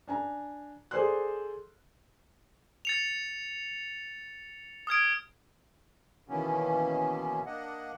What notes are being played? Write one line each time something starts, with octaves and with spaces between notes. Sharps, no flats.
D4 G#5 A#5
G#4 A4 C5 D5 C6 F#6
A6 C#7 F7
D#6 F6 G#6 D7
B2 D#3 E3 A#3 B3 C#4
A#3 D4 D#5 F#5